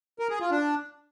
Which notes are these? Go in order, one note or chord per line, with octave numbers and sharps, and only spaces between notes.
A#4
G#4
F4
D4